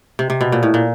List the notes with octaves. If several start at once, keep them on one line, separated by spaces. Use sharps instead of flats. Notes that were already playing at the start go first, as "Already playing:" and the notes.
C3
C3
B2
A#2
A2
A#2